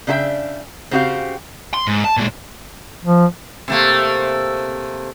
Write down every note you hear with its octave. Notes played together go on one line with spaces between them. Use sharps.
C#3 D4 F4 A4 E5 G5
C#3 C4 F#4 G4 F5
C6
G#2
A5
A#2 G#3
F3
C3 A3 A#3